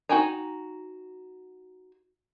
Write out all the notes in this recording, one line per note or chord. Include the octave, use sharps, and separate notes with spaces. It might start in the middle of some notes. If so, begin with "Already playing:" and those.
D#4 F#4 G5 G#5 A#5